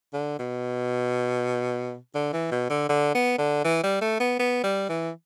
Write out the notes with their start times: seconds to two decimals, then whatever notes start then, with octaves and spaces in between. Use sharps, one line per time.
0.13 D3
0.39 B2
2.15 D3
2.33 E3
2.51 B2
2.70 D3
2.89 D3
3.15 B3
3.38 D3
3.64 E3
3.83 G3
4.01 A3
4.20 B3
4.39 B3
4.64 G3
4.89 E3